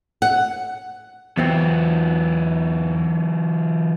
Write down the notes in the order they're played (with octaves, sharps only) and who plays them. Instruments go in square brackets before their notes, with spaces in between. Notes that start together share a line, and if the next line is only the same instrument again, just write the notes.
[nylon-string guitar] F#5
[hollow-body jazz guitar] E2 B3 C4 [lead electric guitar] E3 F#3